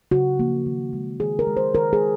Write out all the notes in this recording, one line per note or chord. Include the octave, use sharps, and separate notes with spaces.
C#3 F#4
F3 A#3
D#3
G#3
D#3 G#4
A#4
G#3
C5
D#3 A#4
G#4